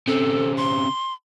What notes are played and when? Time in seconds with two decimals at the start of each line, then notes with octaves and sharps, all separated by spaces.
0.08 C#3 C4 A4
0.57 C6